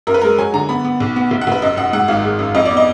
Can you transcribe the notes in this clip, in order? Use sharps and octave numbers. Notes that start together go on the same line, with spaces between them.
F#2 A#4
B4
G#3 A#4
F#3 G#5
D3 A#5
B3 B5
B3
B1
B3
F1
F#5
F1 B4
F#2 D#5
F#2 F#5
G#2 F#5
G#1 F5
G#3
F#2
F2 D#5
B3 D5
D#5